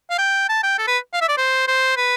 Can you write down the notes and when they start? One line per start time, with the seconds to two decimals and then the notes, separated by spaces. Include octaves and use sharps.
0.10 F5
0.18 G5
0.49 A5
0.63 G5
0.78 A4
0.87 B4
1.13 F5
1.21 E5
1.29 D5
1.37 C5
1.68 C5
1.97 B4